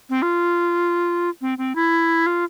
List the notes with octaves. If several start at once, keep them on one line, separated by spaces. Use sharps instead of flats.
C4
F4
C4
C4
E4
F4